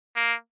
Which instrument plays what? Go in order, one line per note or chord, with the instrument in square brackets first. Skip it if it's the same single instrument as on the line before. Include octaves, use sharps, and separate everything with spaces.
[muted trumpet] A#3